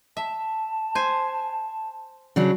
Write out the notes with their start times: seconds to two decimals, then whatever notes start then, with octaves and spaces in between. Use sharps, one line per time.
0.17 E5 A5
0.95 C5 G#5
2.36 C#3 F#3 D4 D5